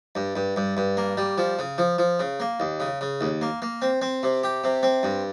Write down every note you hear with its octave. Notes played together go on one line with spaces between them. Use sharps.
G2
G2
G2
G2
A#3
G3
F3
C#3
F3
F3
C#3
A#3
D#2
C#3
C#3
D#2
A#3
A#3
C4
C4
C3
G4
C3
C4
G2